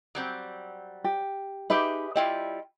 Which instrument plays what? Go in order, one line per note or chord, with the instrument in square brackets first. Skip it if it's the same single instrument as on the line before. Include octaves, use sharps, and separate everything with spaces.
[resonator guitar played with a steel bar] F#3 G3 C4
[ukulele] G4
[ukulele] D#4 E5 B5 [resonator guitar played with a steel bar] G4 G#4 B4
[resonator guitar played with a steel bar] G3 E4 F4 [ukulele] D#5 G5